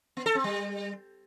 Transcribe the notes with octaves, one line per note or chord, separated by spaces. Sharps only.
B3
A4
C4
G3